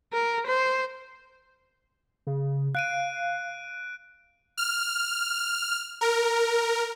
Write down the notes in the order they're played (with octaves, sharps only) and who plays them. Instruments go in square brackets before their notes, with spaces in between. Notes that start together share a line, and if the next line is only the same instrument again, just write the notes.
[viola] A#4
C5
[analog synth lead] C#3
[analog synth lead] F5 [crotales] F#6 D7 D#7
[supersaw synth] F6
A#4